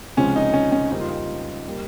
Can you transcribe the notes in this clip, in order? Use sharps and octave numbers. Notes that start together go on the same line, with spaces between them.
C#2 C3 F3 G#3 C#4
D#4
C#4
C#4
F2 C#3 G3 A#3 D#4
F4
D#4
G3 A#3